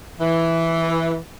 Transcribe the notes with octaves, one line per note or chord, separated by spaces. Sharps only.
E3